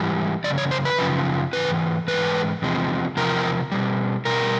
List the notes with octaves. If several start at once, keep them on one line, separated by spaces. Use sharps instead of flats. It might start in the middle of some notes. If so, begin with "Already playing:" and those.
Already playing: G#2 E3 G3
F#2 C#3 D5
C#5
C5
B4
F#2 C#3 F3
G#2 E3 G#3 B4
G#2 E3 G#3 B4
E2 C3 F3 G#3
E2 C3 F3 A#4
B2 G3
B2 G3 A#4